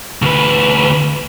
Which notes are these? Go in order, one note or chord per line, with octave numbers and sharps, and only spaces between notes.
D2 B4